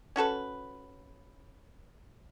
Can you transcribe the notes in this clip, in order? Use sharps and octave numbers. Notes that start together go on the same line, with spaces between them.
C#4 F#4 A4 B4